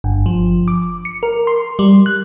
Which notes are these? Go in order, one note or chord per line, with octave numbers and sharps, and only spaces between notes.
G1
F3
D6
C#7
A#4
C6
G3
F#6